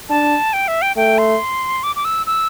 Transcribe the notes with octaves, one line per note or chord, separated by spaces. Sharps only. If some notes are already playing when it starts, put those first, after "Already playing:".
D4 A5
G5
E5
G5
A3 G5
C6
D6
D6
E6
E6